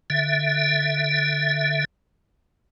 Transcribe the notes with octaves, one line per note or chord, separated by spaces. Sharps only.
D3 E5